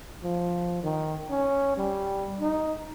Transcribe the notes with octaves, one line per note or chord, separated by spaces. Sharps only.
F3
D#3
C#4
G3
D#4